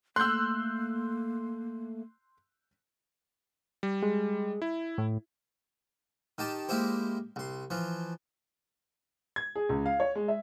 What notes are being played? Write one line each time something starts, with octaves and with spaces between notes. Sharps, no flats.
A3 A#3 C6 E6 F#6 G6
G3
G#3
E4
A2
D#3 G4 A5
G#3 A#3 E4 G4 C5
C2 C6
E3 F3
G#6
G#4
C#2
F5
C#5
G#3
E5